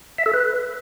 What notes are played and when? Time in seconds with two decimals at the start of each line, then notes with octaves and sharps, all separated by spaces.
0.18 E5
0.26 A4
0.34 B4